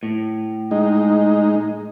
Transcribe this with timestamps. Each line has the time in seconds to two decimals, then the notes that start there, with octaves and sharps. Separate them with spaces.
0.03 A2
0.71 G#3 D#4